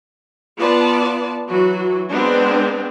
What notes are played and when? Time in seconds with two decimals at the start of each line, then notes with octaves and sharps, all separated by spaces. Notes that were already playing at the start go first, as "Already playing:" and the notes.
0.57 B3 F4 D5 A5
1.47 E3 F#3 F#4
2.10 G#3 B3 C4 D4